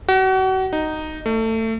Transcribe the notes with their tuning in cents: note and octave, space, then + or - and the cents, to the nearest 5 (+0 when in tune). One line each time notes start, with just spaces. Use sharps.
F#4 +35
D#4 -5
A3 +25